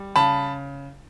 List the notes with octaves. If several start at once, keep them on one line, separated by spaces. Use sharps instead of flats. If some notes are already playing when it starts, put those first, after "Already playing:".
Already playing: G3
C#3 A5 B5